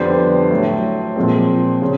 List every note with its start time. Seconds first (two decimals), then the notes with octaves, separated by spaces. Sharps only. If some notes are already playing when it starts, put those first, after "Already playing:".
Already playing: F2 D3 G3 B3 C5 D5
0.50 A2 F#3 A3
1.16 A#2 F3 G#3 C4
1.82 C#3